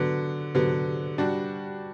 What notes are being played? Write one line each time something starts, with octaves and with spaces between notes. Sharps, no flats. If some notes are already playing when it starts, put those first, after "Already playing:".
Already playing: D3 F#3 B3
D3 F#3 B3
G3 D4 F#4